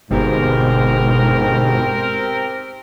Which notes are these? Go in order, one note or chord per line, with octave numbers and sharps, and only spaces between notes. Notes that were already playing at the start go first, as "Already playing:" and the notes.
G1 G#2 B2 C4 G4 A#4